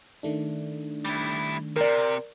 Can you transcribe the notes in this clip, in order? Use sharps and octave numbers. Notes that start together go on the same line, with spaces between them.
D#3 A3 D4
G3 E4
C3 A#4 D5